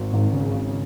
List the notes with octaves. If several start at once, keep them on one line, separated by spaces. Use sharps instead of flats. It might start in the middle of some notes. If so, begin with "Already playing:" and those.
Already playing: G#1
G#1 G#2
C#3
G#1